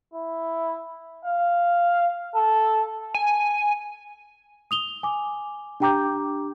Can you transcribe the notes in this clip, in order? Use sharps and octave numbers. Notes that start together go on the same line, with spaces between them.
E4
F5
A4
G#5
D#6 F7 G7
G#5 D6
D4 G4 G5 A#5 D6 G6